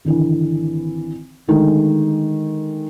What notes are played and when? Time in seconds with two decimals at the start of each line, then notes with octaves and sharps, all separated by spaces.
0.05 G#1 D3 E3
1.48 D3 D#3 G#3 A3